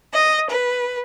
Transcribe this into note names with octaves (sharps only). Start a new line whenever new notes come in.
D#5
B4